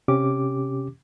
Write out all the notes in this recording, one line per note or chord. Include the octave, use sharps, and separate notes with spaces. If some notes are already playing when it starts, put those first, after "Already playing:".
C3 C#4 G4 D6